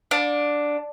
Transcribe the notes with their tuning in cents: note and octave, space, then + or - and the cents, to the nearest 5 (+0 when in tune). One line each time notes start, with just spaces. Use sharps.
D4 +0 F5 +45